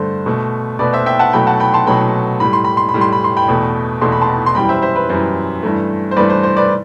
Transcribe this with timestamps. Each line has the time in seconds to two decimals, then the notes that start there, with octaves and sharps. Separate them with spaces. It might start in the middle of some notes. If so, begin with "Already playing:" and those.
Already playing: G2 D3 A3 C5
0.26 B2 A3
0.79 B2 A3 B4 D5
0.93 C5 E5
1.06 E5 G5
1.19 F#5 A5
1.33 B2 F#3 A3 G5 B5
1.47 F#5 A5
1.60 G5 B5
1.74 A5 C6
1.86 B2 F#3 A3 G5 B5
2.40 A2 G3 B5
2.53 C6
2.64 B5
2.77 C6
2.89 B5
2.94 A2 G3
3.01 C6
3.12 B5
3.24 C6
3.37 G5 B5
3.48 E2 B2 A3
4.01 E2 B2 A3 C6
4.12 B5
4.22 A5 C6
4.46 C6
4.55 F#2 E3 G3 G5 B5
4.69 C5 E5
4.82 C5 E5
4.96 B4
5.09 F#2 E3 G3 C5
5.63 G2 E3 A3
6.11 C5
6.17 G2 E3 A3 B4 D5
6.30 C5
6.43 C5
6.57 B4 D5